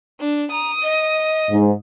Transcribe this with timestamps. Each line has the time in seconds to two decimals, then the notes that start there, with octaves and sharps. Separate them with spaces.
0.20 D4
0.51 A#5 D#6
0.82 D#5
1.50 G#2